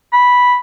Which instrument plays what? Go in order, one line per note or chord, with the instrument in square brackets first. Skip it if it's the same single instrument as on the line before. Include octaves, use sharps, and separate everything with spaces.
[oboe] B5